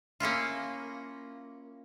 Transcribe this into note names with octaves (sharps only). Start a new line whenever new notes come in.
A#3 C#4 E4 F4